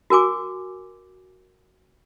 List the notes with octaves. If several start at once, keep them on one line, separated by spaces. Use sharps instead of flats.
F#4 A#4 G#5 D6